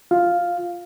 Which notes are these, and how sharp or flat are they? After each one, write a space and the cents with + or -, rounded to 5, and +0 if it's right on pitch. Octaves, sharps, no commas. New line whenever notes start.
F4 +5 F5 +0